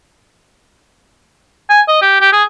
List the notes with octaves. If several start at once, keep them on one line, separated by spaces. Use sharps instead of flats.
G#5
D#5
G4
G4
G#4